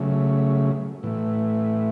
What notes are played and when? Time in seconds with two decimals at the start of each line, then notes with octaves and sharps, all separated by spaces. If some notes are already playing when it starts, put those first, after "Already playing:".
Already playing: C#3 F#3 A3
1.03 A2 E3 A3